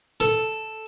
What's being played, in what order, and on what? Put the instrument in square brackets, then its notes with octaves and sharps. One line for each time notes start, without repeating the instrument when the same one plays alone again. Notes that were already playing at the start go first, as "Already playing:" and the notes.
[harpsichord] A4